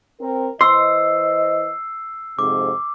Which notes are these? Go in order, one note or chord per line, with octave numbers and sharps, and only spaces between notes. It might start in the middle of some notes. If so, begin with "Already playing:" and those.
C4 A#4
E3 C5 D#5 C6 E6 C7
F2 G#2 C3 D6